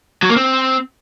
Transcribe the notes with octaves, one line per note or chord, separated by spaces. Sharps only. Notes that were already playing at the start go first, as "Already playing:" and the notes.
F#3
A#3
C4